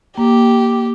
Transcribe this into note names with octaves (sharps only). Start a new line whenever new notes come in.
A#3 G4